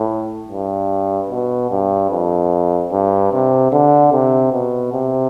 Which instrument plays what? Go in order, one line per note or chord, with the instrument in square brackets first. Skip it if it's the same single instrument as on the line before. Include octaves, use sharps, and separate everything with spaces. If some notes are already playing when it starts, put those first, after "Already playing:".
Already playing: [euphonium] A2
G2
B2
G2
F2
G2
C3
D3
C3
B2
C3